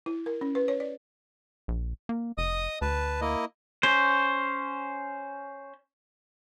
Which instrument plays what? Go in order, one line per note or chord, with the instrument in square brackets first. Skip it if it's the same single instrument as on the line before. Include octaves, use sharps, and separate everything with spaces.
[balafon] E4
A#4
C#4
B4
C#5
D5
[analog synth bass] A#1
A#3
[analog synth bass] F1 [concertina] D#5 D#6
[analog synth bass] D2 [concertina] B4 A5
[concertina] A#3 E4 D#5
[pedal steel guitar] C#4 C5